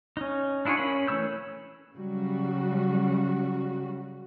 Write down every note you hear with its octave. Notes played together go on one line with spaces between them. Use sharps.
C#4 D#4
D4 E4 F4 G#4 C#5
C#4 A#4 B5
E3 A3 C#5 E6 G6
C#3 F#3 G3 F#4